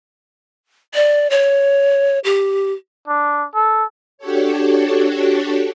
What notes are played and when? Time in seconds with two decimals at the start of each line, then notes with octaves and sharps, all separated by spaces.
0.95 D5
1.30 C#5
2.24 G4
3.08 D4
3.55 A4
4.18 D4 F#4 G4 A4 C#5